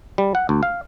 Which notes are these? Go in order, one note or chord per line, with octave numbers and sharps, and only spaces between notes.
G3
F#5
D2
F5